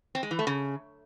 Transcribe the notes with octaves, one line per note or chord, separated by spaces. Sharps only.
C4
G#3
E3
A3
C#3